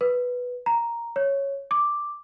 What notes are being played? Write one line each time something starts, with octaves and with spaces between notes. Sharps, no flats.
B4
A#5
C#5
D6